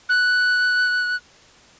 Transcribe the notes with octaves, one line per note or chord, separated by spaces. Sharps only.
F#6